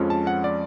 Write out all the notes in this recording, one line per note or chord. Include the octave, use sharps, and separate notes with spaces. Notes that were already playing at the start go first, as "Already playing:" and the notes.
Already playing: F2 F3 G#3 C#4
A5
F#5
D5